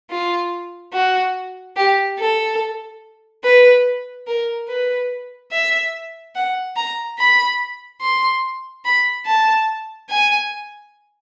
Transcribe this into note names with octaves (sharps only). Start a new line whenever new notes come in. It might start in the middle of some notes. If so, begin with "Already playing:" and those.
F4
F#4
G4
A4
B4
A#4
B4
E5
F#5
A#5
B5
C6
B5
A5
G#5